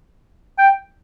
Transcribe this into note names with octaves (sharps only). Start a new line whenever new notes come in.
G5